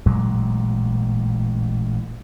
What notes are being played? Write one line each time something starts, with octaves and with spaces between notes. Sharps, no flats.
A1 A#2 F#3 G#3